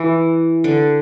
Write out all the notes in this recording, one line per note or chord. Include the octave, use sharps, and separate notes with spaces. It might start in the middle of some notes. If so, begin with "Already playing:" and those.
Already playing: E3
D3